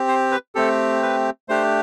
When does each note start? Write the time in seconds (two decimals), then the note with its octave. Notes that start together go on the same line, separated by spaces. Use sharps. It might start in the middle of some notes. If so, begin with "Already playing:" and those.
Already playing: C4 G4
0.08 C5
0.31 B4
0.55 A3 C4 G4 A4
1.02 B4
1.49 A3 D4 G4 C5